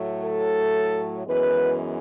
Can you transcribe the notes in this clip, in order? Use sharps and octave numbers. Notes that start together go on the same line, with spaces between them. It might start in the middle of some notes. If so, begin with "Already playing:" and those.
Already playing: A2 F#3 A3
A4
F#2 E3 G#3 B3 B4